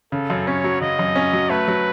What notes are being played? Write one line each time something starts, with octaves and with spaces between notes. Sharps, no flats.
C#3 A4
F#2
C#4 C#5
F#3
C#3 D#5
F#2
C#4
F#3
A3 B4
F#3